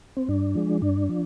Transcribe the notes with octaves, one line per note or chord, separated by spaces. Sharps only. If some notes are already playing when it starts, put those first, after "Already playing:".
C4
G2 D4
F3 G#3
G2 D4
F3